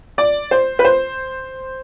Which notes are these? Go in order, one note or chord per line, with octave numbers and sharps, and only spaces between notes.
D5
C5
B4
C5